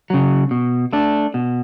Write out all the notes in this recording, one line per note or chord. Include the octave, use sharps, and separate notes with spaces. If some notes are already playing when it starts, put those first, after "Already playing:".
C#3 F#3
B2
A3 D4
B2